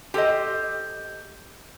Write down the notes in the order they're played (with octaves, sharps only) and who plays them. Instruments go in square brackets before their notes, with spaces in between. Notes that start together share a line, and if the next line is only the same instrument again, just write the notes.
[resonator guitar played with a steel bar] G4 A4 C5 D#5